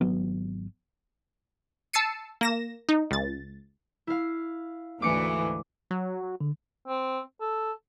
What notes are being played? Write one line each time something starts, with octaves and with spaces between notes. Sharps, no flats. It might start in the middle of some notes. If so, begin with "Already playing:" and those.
G#1 F#3 B3
A5 E6 A6 C7 C#7 D#7
A#3 A#6 E7
D#4
C#2 A6
E4 F5
D2 G#2 E3 D6 C#7
F#3
D3
C4
A4